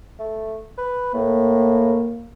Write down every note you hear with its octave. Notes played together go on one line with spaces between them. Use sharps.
A3
B4
A2 A#3